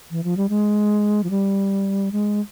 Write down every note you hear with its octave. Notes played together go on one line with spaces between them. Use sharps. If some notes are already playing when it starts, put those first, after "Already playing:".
E3
F3
G3
G#3
F3
G3
G#3